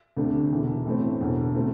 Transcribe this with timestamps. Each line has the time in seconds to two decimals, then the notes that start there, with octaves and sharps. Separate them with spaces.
0.17 D2 C3 A3 D4
0.51 E1 E2 E3
0.85 A2 E3 A3 C4
1.20 E1 E2 D3
1.54 D3 A3 C4 E4